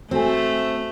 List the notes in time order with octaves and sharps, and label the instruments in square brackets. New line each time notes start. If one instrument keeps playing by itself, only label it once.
[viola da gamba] A3 [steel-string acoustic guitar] C4 [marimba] F#4 A4 G#5